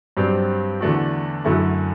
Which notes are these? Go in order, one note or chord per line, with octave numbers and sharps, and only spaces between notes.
G2 F#3 C4 G4 D5
E2 D3 A3 D4 F#4
F#2 D3 F#3 A3 E4